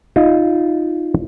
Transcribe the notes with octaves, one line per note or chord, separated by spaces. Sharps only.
D#4 F4